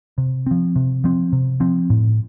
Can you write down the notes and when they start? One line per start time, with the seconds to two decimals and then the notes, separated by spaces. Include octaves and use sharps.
0.18 C3
0.46 F3 C4
0.76 C3
1.04 F3 C4
1.33 C3
1.60 F3 C4
1.90 A2